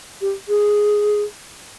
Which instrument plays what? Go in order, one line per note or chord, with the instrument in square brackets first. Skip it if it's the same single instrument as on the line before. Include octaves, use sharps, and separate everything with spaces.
[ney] G4
G#4